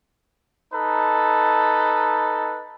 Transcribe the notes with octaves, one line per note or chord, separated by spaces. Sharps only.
D#4 A4 B4